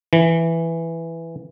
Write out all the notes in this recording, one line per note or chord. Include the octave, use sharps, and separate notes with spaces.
E3